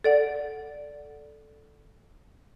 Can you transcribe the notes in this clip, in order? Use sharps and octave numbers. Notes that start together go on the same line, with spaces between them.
A4 D5 F#5